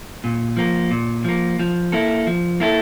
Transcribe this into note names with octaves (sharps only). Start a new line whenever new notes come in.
A#2
F3 A#3
A#2
F3 A#3
F3
A#3 E4 A4
F3
A#3 E4 A4